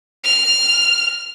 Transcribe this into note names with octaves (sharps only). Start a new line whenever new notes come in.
F6